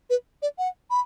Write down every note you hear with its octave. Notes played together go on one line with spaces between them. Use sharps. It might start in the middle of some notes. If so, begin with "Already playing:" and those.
B4
D5
F#5
B5